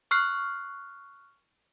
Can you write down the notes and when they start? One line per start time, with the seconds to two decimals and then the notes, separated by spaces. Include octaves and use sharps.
0.11 C#6 F6 F#6 C7